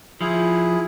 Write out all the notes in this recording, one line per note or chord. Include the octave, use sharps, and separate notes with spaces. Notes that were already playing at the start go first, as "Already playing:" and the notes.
F3 E4 G#4